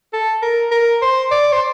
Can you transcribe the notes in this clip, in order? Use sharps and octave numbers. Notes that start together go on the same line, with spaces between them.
A4
A#4
A#4
C5
D5
C5